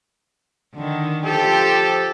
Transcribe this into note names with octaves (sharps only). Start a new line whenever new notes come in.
D3 D#3
F3 G4 A4